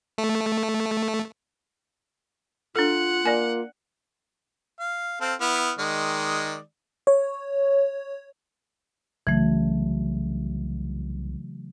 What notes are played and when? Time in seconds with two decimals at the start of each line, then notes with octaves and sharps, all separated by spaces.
0.18 A3
2.76 D4 F4 A4 F#5
3.26 A#3 D5 G#5
4.80 F5
5.21 C4 A4 F5
5.41 B3 E4 F6
5.79 D#3 G#3 D5
7.07 C#5
9.27 C2 C#3 E3 F#3 A3